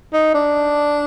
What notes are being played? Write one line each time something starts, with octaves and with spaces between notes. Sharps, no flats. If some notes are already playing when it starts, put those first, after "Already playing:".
D#4
D4